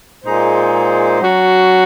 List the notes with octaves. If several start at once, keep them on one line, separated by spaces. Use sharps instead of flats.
A#2 G#3 D#4 G#4 C5
F#3 C#4 F#4